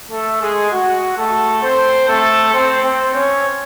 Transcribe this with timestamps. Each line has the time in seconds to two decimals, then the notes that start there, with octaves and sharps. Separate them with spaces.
0.10 A3 A4
0.41 G#3 G#4
0.71 F#4
1.17 A3 A4
1.62 C4 C5
2.08 A3 A4
2.53 C4 C5
2.84 C4 C5
3.14 C#4 C#5